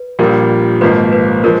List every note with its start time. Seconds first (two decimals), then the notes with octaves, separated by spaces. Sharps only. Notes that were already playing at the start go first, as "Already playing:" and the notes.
Already playing: B4
0.19 A#1 A#2 G3 A#4
0.81 G#1 G#2 F3 A#3 B4
1.12 B4
1.44 F3 G#3 A#4